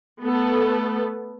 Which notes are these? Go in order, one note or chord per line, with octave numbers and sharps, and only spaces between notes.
A3 B3 A4